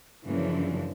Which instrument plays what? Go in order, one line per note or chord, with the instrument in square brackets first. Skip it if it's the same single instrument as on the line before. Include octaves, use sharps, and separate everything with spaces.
[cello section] F#2 C#3 E3 F3 A#3 D4